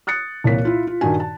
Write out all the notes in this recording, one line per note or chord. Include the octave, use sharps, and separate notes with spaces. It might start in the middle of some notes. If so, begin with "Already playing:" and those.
D#6 F#6 A6 C#7
C2 E3 A#3 C#5 B6
E4 F4
F4
G2 D#3 D#4 F#4 G#5
A5